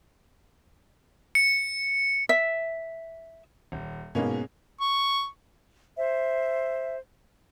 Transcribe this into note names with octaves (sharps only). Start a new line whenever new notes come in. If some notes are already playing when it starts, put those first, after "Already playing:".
C#7
E5
D#1
G#2 B2 A#3 C#4
C#6
C5 E5